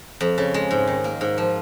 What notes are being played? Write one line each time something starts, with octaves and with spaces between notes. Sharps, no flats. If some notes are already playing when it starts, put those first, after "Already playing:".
F2
C#3
G#3
G#2
D#3
A#3
G#2
F3